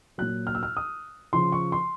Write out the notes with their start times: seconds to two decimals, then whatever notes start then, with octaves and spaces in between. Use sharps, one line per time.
0.18 A#2 F#3 F#6
0.47 F6
0.55 E6
0.63 F6
0.77 D#6
1.33 C#3 F3 C6
1.52 C#6
1.72 C6